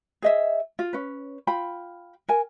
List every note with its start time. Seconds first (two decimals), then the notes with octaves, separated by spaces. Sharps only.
0.22 G#4 D#5 E5
0.79 F4
0.93 C#4 B4
1.47 F4 G5 B5
2.29 A#4 G#5